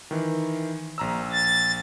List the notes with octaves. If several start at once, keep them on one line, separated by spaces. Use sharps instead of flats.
D#3 E3
A#1 A#5 E6
A6